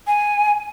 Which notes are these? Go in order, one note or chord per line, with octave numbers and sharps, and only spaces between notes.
G#5